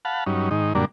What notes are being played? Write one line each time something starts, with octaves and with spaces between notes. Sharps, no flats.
F5 F#5 A5 B5
G2 F#3 C#4 D#4
G#2 D#3 D#4
F#2 A#2 D3 G3 A#3 D4